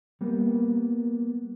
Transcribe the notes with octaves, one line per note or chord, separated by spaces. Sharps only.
G3 A#3 B3